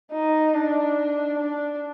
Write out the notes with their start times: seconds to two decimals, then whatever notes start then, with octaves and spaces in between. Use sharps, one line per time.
0.12 D#4
0.54 D4
1.39 D4